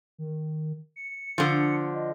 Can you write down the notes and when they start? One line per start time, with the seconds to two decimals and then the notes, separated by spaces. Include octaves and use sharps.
0.18 D#3
0.96 C#7
1.38 D3 F3
1.94 D#5